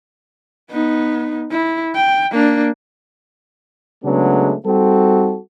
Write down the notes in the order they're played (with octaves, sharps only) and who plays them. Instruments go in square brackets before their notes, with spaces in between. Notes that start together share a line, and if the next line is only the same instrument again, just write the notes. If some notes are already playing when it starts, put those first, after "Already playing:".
[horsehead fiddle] B3 D#4
E4
G5
A#3 D4
[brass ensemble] C#3 F#3 G#3 A3 B3 D4
G3 C4 D#4 F#4 A4